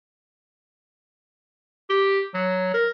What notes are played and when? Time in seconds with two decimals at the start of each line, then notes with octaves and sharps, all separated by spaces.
1.90 G4
2.34 F#3
2.74 A#4